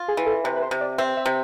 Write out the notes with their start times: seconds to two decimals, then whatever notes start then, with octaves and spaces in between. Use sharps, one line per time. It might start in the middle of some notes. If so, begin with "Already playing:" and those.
Already playing: F4
0.08 G#4
0.17 E3
0.26 A4
0.44 C3 B4
0.56 B4
0.63 C5
0.71 C3
0.81 D5
0.98 C4 E5
1.17 E5
1.26 C3